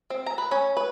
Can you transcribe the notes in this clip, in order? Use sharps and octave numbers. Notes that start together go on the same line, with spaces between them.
C4
A#5
B4
C#4
B4